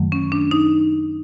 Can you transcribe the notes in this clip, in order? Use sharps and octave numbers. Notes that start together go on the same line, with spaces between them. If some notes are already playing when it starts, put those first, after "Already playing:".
Already playing: F#2 D#3 F#3 A3
C#4
D4
D#4